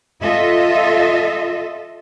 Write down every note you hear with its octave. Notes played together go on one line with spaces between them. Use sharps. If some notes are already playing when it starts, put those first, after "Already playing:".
F4 A4 D#5 E5